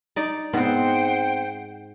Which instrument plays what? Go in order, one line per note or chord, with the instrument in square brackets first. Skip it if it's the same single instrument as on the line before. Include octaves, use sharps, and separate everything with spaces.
[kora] D#4 D5
[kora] G#2 [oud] B3 C4 [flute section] C5 F#5 G5